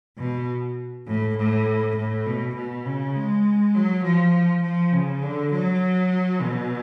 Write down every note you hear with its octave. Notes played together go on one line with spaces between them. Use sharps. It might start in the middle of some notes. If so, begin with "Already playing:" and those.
B2
A2
A2
A2
B2
B2
C#3
G#3
F#3
F3
F3
C#3
D3
F#3
B2